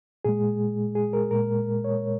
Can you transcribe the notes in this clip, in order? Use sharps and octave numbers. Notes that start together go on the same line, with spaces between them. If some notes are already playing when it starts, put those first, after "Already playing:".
A#2 G#3 G#4
G#4
A#4
A#2 G#3 A#4
C#5